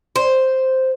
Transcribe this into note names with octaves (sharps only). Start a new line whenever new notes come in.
C5